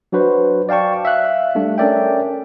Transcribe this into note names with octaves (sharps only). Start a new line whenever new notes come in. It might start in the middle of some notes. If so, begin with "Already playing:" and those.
F#3 D4 F#4 B4 C5
D5 F5 G5 A5 C#6
E5 F5 F#6
G3 A3 D4
C#4 A4 A#4 D5 E5 G5